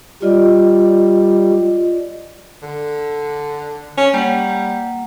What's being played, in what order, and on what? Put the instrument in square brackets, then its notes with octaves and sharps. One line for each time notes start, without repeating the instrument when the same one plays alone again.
[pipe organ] G3 [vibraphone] F4 D5 D#5
[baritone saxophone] D3
C#4
[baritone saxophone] G3 [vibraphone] A#3 F#5